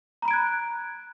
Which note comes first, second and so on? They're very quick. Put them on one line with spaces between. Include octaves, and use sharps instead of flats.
A#5 B5 D7 G#6 F#6